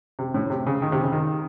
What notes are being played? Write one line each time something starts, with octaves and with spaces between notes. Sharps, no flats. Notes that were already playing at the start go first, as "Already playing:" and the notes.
C3
A2
C3
C#3
D#3
C3
C#3
D#3